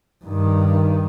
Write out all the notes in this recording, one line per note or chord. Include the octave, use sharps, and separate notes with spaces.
G2 D#3